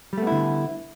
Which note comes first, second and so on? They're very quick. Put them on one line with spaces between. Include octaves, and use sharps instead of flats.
G3 A3 B3 E4 D3